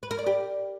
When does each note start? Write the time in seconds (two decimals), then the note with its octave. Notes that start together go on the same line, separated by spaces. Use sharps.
0.03 B4
0.11 A#4
0.19 D5
0.26 G4